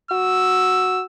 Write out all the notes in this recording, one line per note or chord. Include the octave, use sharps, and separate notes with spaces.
F#4 E6